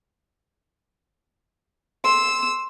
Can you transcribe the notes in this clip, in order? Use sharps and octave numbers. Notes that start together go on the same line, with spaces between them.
C6 E6